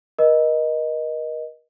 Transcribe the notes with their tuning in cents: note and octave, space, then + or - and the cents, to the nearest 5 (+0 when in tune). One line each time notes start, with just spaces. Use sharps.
A#4 +40 D#5 +0